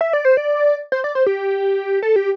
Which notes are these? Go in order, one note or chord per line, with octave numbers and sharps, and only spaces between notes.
E5
D5
C5
D5
C5
D5
C5
G4
A4
G4